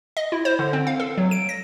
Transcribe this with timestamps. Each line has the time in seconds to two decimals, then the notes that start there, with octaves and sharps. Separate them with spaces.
0.17 D#5
0.32 E4
0.45 C5
0.59 D3
0.73 C4
0.87 F5
1.00 A4
1.18 F#3
1.31 D7
1.49 A#6